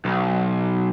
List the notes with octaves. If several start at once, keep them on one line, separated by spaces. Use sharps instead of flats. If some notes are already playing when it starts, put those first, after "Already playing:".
B1